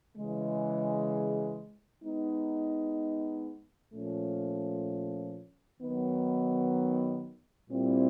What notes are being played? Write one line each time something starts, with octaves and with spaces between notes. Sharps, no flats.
C#3 E3 G#3
G#3 B3 D#4
A#2 F3 A3 C#4
D#3 F#3 B3 D#4
A#2 G3 C4 E4